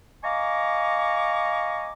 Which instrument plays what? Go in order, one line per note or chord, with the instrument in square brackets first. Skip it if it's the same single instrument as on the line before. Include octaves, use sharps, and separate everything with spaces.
[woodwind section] D#5 F5 G#5 A#5 C#6 D6